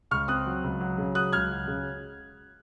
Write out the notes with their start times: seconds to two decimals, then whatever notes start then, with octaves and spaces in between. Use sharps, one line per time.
0.11 C#2 C#6 F6
0.28 C4 D#6 F#6
0.46 F#3
0.64 C#2
0.80 F#3
0.98 C#3
1.15 F#3 D#6 F#6
1.33 C#2 F6 G#6
1.51 F#3
1.68 C#3